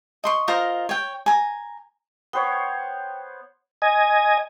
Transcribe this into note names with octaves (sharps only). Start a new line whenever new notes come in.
D#5 C6 C#6
F4 A#4 C5 D#5
C#5 G5
G#5 A#5
B3 C5 C#5 G5
D#5 G#5